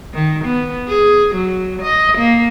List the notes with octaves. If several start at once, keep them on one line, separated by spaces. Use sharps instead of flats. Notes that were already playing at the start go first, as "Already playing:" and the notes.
D#3
B3
G#4
F#3
D#5
A#3